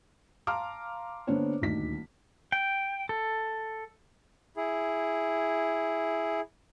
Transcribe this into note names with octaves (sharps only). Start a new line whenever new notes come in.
F5 A5 A#5 C6 D6 F6
D3 A#3 B3 D4 C5 C#5
D#1 D2 D#4 B6
G5
A4
E4 G#4